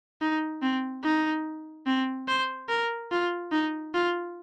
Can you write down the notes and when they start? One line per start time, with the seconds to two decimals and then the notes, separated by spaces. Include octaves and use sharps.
0.21 D#4
0.62 C4
1.04 D#4
1.87 C4
2.28 C5
2.69 A#4
3.11 F4
3.52 D#4
3.94 F4